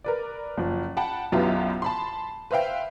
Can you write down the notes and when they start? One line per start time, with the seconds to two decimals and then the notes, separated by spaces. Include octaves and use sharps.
0.04 A#4 B4 D5
0.57 F#1 F3
0.97 F#5 G5 A5 B5
1.32 B1 F#2 E4 F4 G4 B4
1.82 A5 B5 C6
2.51 B4 C5 E5 F5 G5